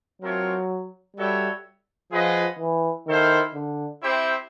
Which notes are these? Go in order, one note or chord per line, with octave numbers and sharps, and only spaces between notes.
F#3 A3 C4 F4 A#4 C#5
G3 F#4 A4 C#5 E5 G5
F3 F4 G#4 B4 D#5 F#5
E3
D#3 E4 A4 C5 F5
D3
C4 E4 G4 C5 E5